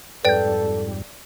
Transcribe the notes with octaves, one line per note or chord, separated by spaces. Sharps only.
F2 G#2 G3 A4 B4 D5 G5 G6